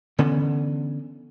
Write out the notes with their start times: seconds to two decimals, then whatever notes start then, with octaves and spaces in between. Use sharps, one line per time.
0.19 D3 E3 B3 C#4